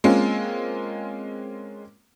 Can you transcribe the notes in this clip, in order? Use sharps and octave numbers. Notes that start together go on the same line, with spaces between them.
G#3 A#3 C4 C#4 F4